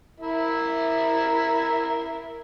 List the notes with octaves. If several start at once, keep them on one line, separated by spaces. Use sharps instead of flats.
E4 A#4 E5